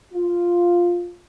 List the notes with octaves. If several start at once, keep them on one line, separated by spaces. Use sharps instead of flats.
F4